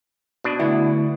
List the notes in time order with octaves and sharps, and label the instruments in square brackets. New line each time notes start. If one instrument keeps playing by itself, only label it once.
[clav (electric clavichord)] B2 D4
[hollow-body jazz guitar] D2 B3 E4